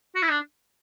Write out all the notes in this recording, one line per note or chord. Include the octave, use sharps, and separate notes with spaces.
F#4
E4
D4